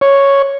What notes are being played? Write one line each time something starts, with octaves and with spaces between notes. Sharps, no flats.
C#5